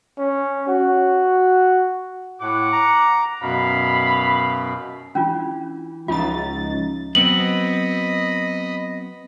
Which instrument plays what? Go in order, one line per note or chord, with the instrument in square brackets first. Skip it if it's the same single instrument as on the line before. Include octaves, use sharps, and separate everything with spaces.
[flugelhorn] C#4
F#4
[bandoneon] A2 [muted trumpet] F#5 [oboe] D6
[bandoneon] A#5
[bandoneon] F#2 B2 [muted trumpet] F5 [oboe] B5
[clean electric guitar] E3 [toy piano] C#4 D4 F4
[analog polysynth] C#2 D#4 A6 [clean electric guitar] F3 C#4 E5 [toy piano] F4
[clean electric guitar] F#3 B3 C4 [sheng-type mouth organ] D#5 B5 [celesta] F#7